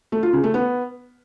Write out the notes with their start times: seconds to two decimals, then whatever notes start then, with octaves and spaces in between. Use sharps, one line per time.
0.12 A3
0.23 F4
0.33 C#3
0.44 A3
0.54 B3